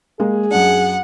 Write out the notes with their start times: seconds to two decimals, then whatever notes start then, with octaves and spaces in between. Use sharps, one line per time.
0.20 G#3 A#3 G#4
0.51 F#2 D4 F#5